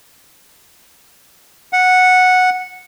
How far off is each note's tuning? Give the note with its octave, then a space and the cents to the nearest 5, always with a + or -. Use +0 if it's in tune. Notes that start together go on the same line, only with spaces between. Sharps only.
F#5 -10